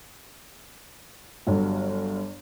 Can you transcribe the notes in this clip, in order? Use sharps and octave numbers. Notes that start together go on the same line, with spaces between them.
G1 G2 F#3